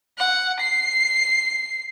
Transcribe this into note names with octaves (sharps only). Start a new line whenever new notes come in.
F#5
C7